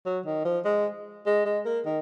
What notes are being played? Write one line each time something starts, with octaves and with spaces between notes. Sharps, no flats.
F#3
D#3
F3
G#3
G#3
G#3
A#3
D#3